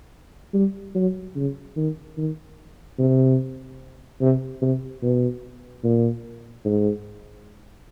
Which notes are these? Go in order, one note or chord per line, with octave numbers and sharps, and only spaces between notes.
G3
F#3
C#3
D#3
D#3
C3
C3
C3
B2
A#2
G#2